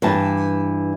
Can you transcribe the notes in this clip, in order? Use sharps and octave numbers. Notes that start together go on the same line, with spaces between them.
G2 E3 A5